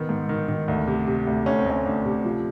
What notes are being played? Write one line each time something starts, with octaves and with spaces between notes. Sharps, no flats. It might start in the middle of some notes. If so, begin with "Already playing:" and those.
Already playing: D#3 B3
G#2
D#3
D#3
D2
C3
C3
D2
D2 C#4
C4
D2 C#4
D2 D4
C3
F3